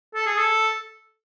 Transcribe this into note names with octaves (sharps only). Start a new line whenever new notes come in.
A4
G#4
A4